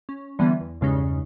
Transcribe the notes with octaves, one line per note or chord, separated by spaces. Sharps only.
C#4
D3 E3 G3 B3
E2
E2 G2 C#3 G#3 C#4 D#4